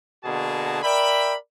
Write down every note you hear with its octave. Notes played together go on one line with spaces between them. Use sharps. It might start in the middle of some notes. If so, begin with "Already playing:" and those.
B2 D3 A#3 F#4 G#4 A5
A#4 D5 E5 G5 B5